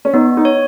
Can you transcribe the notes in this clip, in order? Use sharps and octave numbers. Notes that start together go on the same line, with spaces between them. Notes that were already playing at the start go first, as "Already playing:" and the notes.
C#4
B3 D#4
D#4
C#5